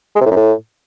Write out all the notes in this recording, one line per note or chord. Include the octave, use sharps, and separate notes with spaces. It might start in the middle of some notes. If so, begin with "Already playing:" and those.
G#3
C3
A2
F#2
A2